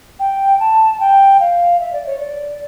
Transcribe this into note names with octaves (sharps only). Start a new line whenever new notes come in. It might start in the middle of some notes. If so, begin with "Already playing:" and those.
G5
A5
G5
F5
E5
D5
C#5
D5